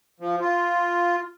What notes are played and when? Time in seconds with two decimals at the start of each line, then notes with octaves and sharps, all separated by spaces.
0.20 F3
0.41 F4